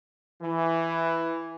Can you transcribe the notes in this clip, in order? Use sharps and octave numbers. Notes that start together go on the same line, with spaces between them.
E3